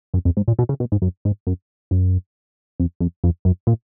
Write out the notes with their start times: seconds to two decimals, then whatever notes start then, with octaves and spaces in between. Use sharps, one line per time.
0.14 F#2
0.25 F2
0.37 G#2
0.48 A#2
0.59 B2
0.69 C#3
0.80 B2
0.92 G#2
1.02 F#2
1.25 G#2
1.47 F#2
1.91 F#2
2.80 F2
3.00 F2
3.24 F2
3.45 F#2
3.67 A#2